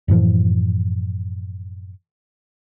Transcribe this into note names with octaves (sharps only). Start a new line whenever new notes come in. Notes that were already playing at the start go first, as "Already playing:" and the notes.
F#2 A2 E3 F3